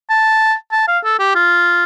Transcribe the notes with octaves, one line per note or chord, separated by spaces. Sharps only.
A5
A5
F5
A4
G4
F4